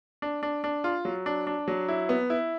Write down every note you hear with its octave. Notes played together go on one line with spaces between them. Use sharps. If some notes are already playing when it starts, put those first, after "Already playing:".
D4
D4
D4
F4
F#3
D4
D4
F#3
E4
B3
E4